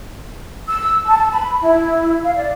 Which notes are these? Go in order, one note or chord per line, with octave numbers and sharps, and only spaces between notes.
E6
A5
B5
E4
F5
D5